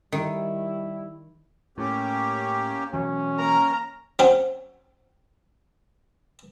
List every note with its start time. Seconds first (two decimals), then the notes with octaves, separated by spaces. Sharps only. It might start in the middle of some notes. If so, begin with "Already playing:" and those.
0.12 D#3 G3 E4
1.78 A2 A#3 C#4 G4
2.93 B2 E3 F#3 C#4
3.38 A#3 A#4 A#5
4.19 F#3 C4 C#4